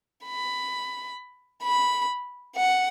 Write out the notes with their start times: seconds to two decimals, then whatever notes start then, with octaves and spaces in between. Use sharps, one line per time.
0.25 B5
1.64 B5
2.56 F#5